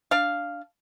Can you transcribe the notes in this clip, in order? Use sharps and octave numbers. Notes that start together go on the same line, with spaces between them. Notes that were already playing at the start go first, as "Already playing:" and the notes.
D4 F5